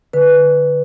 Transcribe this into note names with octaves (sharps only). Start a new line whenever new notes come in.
D3 B4